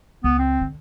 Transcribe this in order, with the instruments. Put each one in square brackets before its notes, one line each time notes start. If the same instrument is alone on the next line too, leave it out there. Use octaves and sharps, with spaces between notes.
[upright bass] C#2 [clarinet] B3
[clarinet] C4
[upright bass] D3